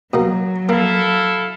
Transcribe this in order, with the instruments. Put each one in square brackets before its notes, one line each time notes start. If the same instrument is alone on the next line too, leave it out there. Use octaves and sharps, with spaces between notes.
[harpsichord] B2 A#3 [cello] F#3
[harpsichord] A#3 [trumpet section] E4 A4 F5